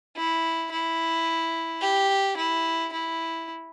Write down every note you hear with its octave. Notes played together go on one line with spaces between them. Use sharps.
E4
E4
G4
E4
E4